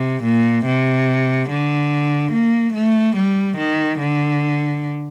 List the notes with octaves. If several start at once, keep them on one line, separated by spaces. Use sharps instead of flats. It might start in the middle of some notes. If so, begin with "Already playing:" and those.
Already playing: C3
A#2
C3
D3
A#3
A3
G3
D#3
D3